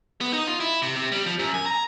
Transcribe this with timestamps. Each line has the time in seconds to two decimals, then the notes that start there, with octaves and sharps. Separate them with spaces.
0.21 B3
0.33 D#4
0.47 F4
0.60 E4
0.82 C3
0.95 C3
1.12 G3
1.26 F3
1.39 F#2
1.54 G#5
1.66 A#5